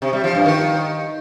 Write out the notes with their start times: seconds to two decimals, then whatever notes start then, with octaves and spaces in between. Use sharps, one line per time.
0.02 C3
0.13 G3
0.24 F3
0.35 G2
0.46 D#3